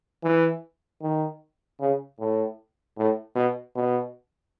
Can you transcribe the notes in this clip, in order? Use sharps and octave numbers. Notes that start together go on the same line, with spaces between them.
E3
D#3
C#3
A2
A2
B2
B2